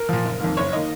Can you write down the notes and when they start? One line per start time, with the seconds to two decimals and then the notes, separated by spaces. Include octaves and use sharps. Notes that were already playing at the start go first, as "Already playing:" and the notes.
Already playing: A#4
0.09 A#2 F3
0.25 F#1
0.40 F2 D#3 A#3
0.57 F#1 C#5
0.73 D#3 A#3 D#5